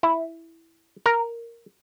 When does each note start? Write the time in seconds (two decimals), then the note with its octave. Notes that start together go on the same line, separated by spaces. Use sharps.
0.03 E4
1.06 A#4